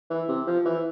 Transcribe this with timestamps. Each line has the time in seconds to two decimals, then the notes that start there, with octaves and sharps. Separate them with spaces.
0.10 E3
0.29 C3
0.47 F3
0.66 E3